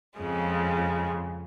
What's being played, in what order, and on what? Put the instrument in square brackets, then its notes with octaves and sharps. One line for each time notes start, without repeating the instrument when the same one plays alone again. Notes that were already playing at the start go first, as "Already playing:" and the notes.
[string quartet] F2 C#3 G#3